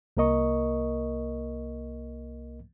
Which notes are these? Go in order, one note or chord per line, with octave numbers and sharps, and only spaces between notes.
C2 A#3 A#4 D#5 C#6